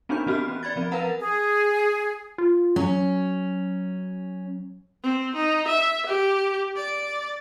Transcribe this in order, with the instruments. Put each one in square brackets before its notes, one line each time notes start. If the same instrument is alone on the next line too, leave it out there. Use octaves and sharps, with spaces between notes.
[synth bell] B3 C4 D4 D#4 F#4 G6
E3 C4 F#4 G4 F6
C#4
D5 B5 G#6 A6
F3 C4
A#4 B4 F5 F#5 A#5
[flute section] G#4
[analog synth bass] F4
[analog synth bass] F#3 [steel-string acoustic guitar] C#4
[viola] C4
D#4
E5
G4
D5